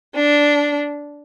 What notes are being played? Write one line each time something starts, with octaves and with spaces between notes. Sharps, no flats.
D4